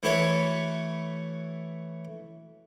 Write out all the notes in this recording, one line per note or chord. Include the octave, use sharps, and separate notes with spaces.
E3 A3 E4 F#4 B4 C#5